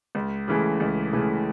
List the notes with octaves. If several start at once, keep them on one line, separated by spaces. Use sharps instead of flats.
C#2
C#3 E3 A3
C#2
C#3 E3 A3